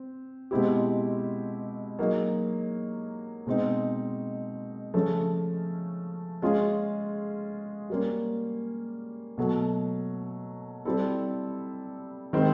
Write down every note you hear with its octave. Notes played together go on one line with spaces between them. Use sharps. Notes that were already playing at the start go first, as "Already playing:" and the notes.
Already playing: C4
B2 G#3 C4 E4 G4
F#3 A#3 D#4 G#4
B2 G#3 C4 D#4
C#3 F3 A3 C#4
G#3 C#4 F4 G#4
G3 A#3 C#4
B2 F#3 A3
G3 C4 E4 A4
D#3 G#3 C4 E4